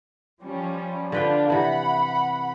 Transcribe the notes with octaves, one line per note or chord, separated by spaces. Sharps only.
F3 G3 C#4
D3 D4 F4 B4 G5
C3 E3 F#5 B5